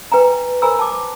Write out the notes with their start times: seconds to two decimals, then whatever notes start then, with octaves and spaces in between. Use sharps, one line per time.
0.12 B4 G5 G#5 A#5
0.62 A#4 C5 G#5 A#5 B5 E6
0.79 A5 D6